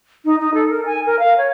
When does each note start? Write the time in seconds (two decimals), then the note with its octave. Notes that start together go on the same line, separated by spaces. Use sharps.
0.25 D#4
0.40 D#4
0.54 A4
0.70 A#4
0.85 G#5
1.06 A#4
1.19 F5
1.38 C#5